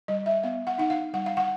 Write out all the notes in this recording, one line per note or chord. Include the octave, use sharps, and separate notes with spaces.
G3 D#5
E5
B3 F5
F#5
D#4 F#5
F5
G3 F#5
F5
F#5